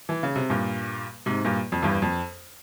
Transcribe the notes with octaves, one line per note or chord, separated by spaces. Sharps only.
E3
C#3
C3
G2 A#2
G#2 C3
G2 A#2
F2
E2 G2
F2